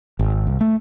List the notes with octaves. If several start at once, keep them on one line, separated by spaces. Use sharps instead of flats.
G#1
C2
A3